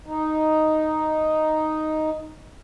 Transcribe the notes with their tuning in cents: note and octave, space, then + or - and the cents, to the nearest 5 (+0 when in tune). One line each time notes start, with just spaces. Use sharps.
D#4 +0